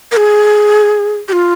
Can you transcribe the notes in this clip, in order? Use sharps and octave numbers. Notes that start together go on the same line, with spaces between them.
A#4
G#4
G4
F4